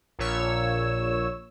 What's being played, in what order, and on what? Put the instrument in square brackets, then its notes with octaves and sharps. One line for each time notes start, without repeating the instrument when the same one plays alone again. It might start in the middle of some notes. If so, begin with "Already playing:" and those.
[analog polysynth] A#1 A#2 C#5 E6